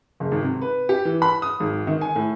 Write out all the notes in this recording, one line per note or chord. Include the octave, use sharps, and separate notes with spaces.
F#1
G#1
C3
B4
G4
E3
B5
D#6
G#1
D#3
G#5
A2